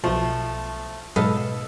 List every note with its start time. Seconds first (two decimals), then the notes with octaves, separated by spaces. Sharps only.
0.04 B1 B2 F3 A3
1.16 G#2 B2 F#3 A4 B4 D#5 F5